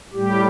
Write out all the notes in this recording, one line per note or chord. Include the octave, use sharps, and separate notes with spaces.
A2 G3 G4